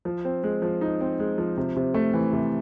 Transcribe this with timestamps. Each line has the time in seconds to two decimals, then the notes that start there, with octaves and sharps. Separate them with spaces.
0.05 F3
0.25 C4
0.44 G#3
0.62 F3
0.81 D#4
1.01 C4
1.19 G#3
1.38 F3
1.57 C3
1.76 C3
1.94 A3
2.14 E3
2.33 C3